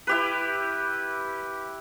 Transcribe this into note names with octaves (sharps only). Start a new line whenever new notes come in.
E4 G4 B4